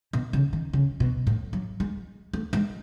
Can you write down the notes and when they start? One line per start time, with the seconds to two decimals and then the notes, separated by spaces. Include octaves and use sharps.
0.13 B2
0.33 C#3
0.53 D#3
0.73 C#3
1.00 B2
1.27 A2
1.53 F#3
1.80 G#3
2.33 A3
2.53 G#3